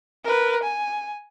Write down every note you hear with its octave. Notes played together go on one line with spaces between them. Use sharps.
A#4 B4
G#5